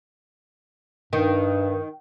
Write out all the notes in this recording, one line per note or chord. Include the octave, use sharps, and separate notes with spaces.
G2 D#3